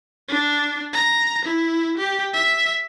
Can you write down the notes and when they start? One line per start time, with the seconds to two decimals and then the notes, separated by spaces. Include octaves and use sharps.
0.28 D4
0.93 A#5
1.45 E4
1.98 G4
2.33 E5